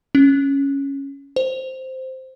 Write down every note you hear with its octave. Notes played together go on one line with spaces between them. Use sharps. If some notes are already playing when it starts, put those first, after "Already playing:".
C#4
C5